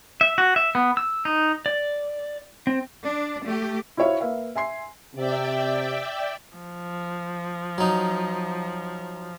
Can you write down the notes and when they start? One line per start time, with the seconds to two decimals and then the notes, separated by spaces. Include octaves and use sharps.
0.21 E5
0.38 F#4
0.56 E5
0.75 B3
0.97 E6
1.25 D#4
1.66 D5
2.67 C4
3.05 D4
3.44 A3 G4
3.97 E4 F#4 C5 C#5 E5 F5
4.20 A#3 B4 E5 F5
4.55 E5 G#5 C6 C7
5.15 C3 D5 E5 G5
6.57 F3
7.78 F#3 D#4